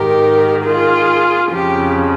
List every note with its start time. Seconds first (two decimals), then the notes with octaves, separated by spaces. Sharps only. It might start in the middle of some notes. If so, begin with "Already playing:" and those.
Already playing: G#2 D#3 G4 A#4
0.64 F4 G#4
1.52 F2 C#3 F3 G4